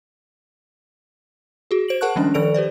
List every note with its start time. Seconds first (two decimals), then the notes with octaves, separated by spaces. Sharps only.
1.71 F#4 G#4
1.88 C5 D7 F#7
2.01 G#4 A#4 F#5 A5 C#6 F#6
2.16 D#3 F3 G3 G#3 C#4 D4
2.34 D#3 F3 A4 D5 D7 F7
2.54 G4 B4 C5 D5